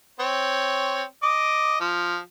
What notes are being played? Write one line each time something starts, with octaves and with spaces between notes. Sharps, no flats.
C4 C#5
D#5 D6
F3